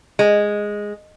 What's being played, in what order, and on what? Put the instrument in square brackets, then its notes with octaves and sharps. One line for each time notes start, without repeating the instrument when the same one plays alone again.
[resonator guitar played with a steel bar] G#3